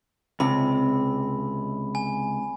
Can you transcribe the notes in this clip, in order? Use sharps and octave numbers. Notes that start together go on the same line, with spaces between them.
C#2 C3 B5
G#5